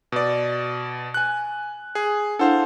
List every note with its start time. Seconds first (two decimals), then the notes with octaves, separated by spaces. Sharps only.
0.12 B2 D5
1.14 G#5 F#6
1.95 G#4
2.39 D4 E4 A4 C5 F5 F#5